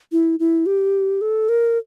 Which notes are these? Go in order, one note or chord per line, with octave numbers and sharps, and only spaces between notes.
E4
E4
G4
A4
A#4